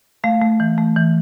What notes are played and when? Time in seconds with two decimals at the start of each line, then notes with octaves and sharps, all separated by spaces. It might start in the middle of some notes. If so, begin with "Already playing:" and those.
0.24 A3 F5
0.41 A3
0.60 E3
0.78 A3
0.96 E3